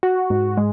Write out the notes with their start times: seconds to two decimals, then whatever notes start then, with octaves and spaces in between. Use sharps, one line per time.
0.03 F#4
0.30 G#2
0.57 G#3